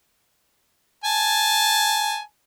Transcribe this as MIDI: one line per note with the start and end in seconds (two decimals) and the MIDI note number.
1.04 2.20 80
1.04 2.20 81